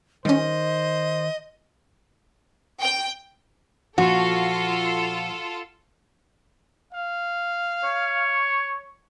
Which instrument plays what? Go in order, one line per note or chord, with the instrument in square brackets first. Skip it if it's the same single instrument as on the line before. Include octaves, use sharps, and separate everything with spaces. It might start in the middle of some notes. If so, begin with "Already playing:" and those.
[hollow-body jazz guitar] D#3 [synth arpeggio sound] G3 C#4 [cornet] C5 [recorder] D#5
[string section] G5
[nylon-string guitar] A#2 F3 [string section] F4 A4 [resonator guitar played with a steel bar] F#4
[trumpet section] F5
[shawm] C#5